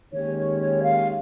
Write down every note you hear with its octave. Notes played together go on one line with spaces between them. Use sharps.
D#2 D#3 G#3 C#4 G4 C#5
C#5
C#5
F5